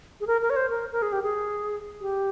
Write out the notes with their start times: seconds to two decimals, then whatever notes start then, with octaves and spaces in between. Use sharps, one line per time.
0.21 G#4
0.27 A#4
0.42 A#4
0.50 C#5
0.56 C5
0.70 A#4
0.92 A#4
1.02 G#4
1.12 G4
1.23 G#4
2.01 G4